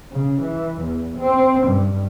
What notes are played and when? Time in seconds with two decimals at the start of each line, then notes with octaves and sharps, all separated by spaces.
0.12 C#3
0.42 E3
0.82 E2
1.19 C4
1.67 G2